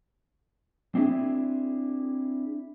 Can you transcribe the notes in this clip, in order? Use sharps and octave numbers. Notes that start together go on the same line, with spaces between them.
C4 D4 E4 G#4